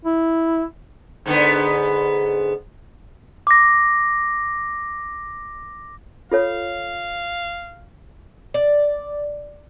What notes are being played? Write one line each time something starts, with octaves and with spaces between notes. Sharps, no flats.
E4
G#2 D3 B3
D6 A#6
F4 A4 C#5 F5
D5